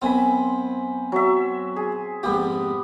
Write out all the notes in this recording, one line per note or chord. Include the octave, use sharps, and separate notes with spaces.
F#2 B3 C4 G#5 B5
F#3 E5
G#4
F2 G#2 A#3 B3 G4